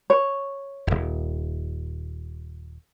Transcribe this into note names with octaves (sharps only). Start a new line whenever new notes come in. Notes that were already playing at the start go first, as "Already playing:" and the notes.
C#5
D#1 G#1